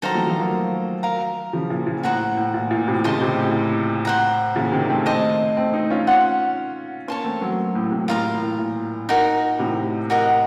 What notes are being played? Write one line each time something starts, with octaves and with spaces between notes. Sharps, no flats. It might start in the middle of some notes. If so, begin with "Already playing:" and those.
D#3 F#3 A4 C5 F5 A#5
F3 A3
F3 A3
F#3 A#3
A#4 F5 A#5
C#3 F3
A#2
A#2
A2 F#4 C5 F#5 A#5
A2
A#2
A#2
A2 C3
A#2 C#3 C5 D#5 A5 C6
A2 C3
A2
C5 F#5 A#5
A#2 C#3
C3 D#3
A3 C4
C5 D#5 A5
A3 C4
C4 D#4
C#4 F4
C#5 F#5 C6
A#3 C#4 C#5 A5 C6
A3 C4
F#3 A#3
A2
A2 C3
A2 F4 A#4 F5 A#5
A2
A#2
D#4 F#4 A#4
A2 C3
F#4 A#4 D#5 F#5